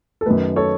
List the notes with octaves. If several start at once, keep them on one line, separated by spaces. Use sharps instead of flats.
A4
F#2 D#3 A3 B4
A4 C#5